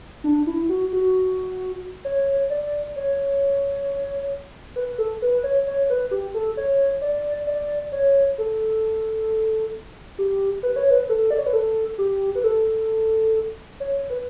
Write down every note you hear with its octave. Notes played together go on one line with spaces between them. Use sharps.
D4
E4
F#4
F#4
C#5
D5
C#5
B4
A4
B4
C#5
C#5
B4
G4
A4
C#5
D5
D5
C#5
A4
G4
B4
C#5
B4
A4
D5
C#5
B4
A4
G4
B4
A4
C#5
B4